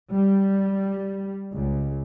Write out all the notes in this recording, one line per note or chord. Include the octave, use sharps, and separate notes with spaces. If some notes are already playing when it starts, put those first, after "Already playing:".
G3
C#2